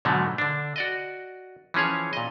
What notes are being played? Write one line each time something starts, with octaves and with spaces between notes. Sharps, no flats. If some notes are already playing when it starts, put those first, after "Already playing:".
G#2 B2 D3 F3 F#3 A3
D3 D4
F#4 D5 D#5
E3 F3 C#4 G#4 C#5
A#2 D#5